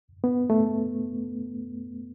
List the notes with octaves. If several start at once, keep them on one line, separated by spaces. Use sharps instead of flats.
B3
A3